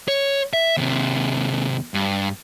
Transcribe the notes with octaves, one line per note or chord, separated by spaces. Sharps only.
C#5
E5
D#2 C3
G2